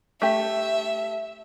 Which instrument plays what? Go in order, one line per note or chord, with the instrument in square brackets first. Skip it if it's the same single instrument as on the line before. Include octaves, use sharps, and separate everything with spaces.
[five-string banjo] A3 G4 [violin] E5